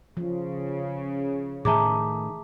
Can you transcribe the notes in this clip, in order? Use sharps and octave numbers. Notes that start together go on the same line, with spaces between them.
C#3 F3
A2 D#3 G#4 E5 A5 A#5 D6